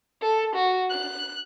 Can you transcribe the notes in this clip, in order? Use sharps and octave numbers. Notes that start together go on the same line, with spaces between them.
A4
F#4
F#6